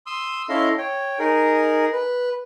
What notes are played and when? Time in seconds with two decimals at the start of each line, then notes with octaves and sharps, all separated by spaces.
0.06 C6 D#6 E6
0.49 C#4 E4 A4 D#5 F5 C6
0.78 C#5 G5
1.19 D#4 G#4 A#4
1.93 B4